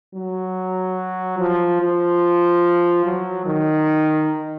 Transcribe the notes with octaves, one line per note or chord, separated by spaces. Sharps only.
F#3
F3
F3
F#3
D#3